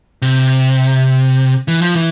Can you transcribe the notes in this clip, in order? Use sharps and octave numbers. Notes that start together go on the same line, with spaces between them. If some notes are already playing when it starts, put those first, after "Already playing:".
C3
E3
F3
E3